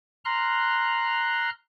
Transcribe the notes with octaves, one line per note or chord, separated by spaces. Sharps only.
A#5 C6 F6 F#6